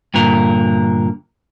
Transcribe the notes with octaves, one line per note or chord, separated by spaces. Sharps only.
G2 A#2 D3 A#4